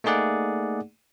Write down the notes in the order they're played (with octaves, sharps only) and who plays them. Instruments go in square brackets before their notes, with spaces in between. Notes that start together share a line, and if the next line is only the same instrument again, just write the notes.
[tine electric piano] A3 A#3 D#4 G#4 D5 F#5